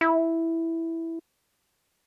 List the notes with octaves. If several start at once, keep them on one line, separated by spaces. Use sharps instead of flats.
E4